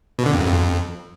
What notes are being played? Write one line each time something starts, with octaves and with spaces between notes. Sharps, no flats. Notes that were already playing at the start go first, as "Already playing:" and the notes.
B2
D3
F2
F#2
F2